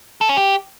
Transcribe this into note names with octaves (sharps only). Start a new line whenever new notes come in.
A4
C#4
G4